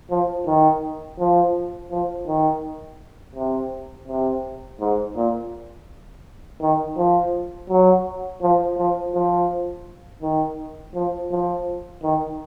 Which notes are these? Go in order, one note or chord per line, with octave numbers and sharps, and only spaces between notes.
F3
D#3
F3
F3
D#3
C3
C3
G#2
A#2
D#3
F3
F#3
F3
F3
F3
D#3
F3
F3
D#3